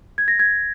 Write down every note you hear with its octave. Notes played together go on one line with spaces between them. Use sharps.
G#6
A#6
G#6